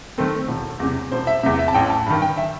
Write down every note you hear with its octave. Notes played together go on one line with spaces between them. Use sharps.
D#3 A3 C4
E1
E2 C3
E1 C5
E5
E2 C3 E5
E5
A5
A1 G5
A5
G2 D#3 B5
G5
E5